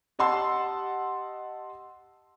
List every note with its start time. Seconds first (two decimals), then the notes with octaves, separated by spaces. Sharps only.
0.19 G4 D#5 F#5 A5 C6 E6